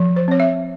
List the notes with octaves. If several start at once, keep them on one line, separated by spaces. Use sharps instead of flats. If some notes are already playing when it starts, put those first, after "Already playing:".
Already playing: F3
C5
C4 C#5
E5